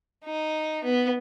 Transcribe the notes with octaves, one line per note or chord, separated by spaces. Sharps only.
D#4
B3